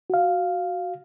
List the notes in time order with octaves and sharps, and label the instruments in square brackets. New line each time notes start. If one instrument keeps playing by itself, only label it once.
[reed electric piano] F#4 F5